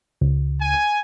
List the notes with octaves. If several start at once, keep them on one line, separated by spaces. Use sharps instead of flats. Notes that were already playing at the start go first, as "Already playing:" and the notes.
C#2
G#5